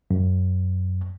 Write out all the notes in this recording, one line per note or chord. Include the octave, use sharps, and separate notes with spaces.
F#2